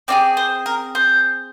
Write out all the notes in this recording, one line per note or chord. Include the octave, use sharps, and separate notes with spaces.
C4 F4 G#4 D5
C5
A#4
C5